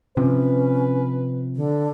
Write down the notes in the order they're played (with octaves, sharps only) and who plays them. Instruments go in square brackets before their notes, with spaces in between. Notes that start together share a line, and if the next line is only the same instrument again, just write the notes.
[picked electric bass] C3 F3 [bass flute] C#4 [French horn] B4
[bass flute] D3